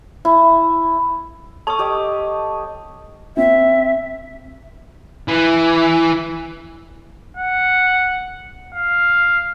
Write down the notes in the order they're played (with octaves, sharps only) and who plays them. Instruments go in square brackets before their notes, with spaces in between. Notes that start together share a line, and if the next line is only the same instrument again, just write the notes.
[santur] E4
[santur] A4 C#5 D#6 [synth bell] A5 C#6
[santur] G4 C#5 D#5
[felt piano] C4 [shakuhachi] E5
[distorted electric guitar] E3
[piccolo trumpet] F#5
F5